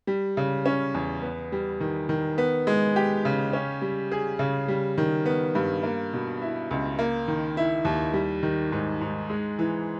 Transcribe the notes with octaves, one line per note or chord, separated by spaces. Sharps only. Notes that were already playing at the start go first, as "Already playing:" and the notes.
G3
C#3
C#4
E2
B3
G3
D#3
D#3
B3
G#3
G4
C#3
C#4
G3
G#4
C#3
G3
D#3
B3
G2
A#3
B2
E4
C#2
A#3
D#3
E4
D#2
G3
D#3
G#2
G#2
G#3
E3